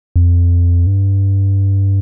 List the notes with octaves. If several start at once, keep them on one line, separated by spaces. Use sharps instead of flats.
F2
G2